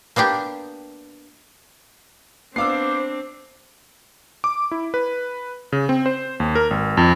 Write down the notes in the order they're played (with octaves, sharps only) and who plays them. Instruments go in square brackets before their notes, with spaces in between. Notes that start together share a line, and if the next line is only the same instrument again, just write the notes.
[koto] A#3 B3 D4 G4
[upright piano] B3 F5 E6 [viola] C4 D4 [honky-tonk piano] D6 C7
[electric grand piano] D6
E4
B4
C#3
C4
C5
D#2
A#4
G#1
F2